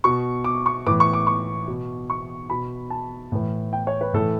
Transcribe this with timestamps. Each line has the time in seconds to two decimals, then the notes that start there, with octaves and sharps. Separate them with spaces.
0.04 B2 C#6
0.44 D6
0.66 C#6
0.87 A2 E3 D6
1.00 C#6
1.14 D6
1.27 C#6
1.68 B2
2.10 C#6
2.50 B2 B5
2.90 A5
3.32 A2 E3
3.73 G5
3.87 C#5
4.01 B4
4.13 A2 E3 A4